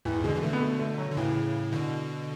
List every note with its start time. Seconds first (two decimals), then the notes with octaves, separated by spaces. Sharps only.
0.05 E2 G#2 E3
0.24 B2 D3 G#3
0.35 E3
0.42 B2 D3 A3
0.53 B3
0.61 A3
0.79 A3
0.98 F#3
1.11 D3
1.17 A2 C#3 E3
1.72 B2 D3